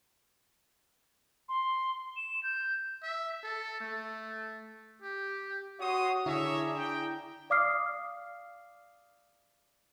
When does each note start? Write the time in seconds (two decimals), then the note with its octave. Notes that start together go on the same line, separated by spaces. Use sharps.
1.49 C6
2.17 E7
2.43 G6
3.03 E5
3.43 A4
3.81 A3
5.02 G4
5.80 F#4 C#5 C6 D#6
6.26 D3 D4 E4 G#4 C#5 E5 A#5
6.76 G5
7.50 D5 F5 D6 D#6 F6 C7